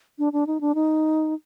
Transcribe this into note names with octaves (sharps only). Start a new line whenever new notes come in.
D4
D4
D#4
D4
D#4